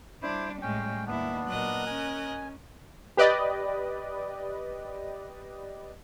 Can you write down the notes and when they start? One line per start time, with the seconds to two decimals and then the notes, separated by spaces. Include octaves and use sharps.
0.22 G3 D4 E4 C5 D5
0.62 A2 G#3 C#4 G5
1.06 D#2 B3 D4 E4
1.47 A#2 F#3 A#4 D#5 F#6
1.86 C#4 G#5
3.17 G4 B4 D5 D#5